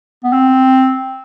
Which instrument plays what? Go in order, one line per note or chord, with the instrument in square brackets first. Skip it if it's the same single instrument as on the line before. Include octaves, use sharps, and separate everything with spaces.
[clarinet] B3
C4